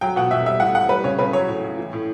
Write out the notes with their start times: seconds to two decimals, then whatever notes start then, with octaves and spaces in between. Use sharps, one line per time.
0.01 F#3 G5
0.16 B2 F#5
0.31 B2 E5
0.46 G3 E5
0.60 A2 F#5
0.75 A2 F#5
0.89 G3 B4
1.04 C#3 C#5
1.19 C#3 B4
1.33 F#3 C#5
1.48 A2
1.64 A2
1.78 E3
1.93 A2